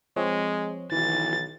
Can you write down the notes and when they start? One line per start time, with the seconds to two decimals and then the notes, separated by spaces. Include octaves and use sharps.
0.16 F3 G#3 C4 C#5
0.92 B1 D#3 E3 A6